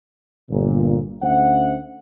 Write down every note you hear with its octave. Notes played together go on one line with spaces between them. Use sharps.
G1 A#2
D2 C#4 C5 E5 F#5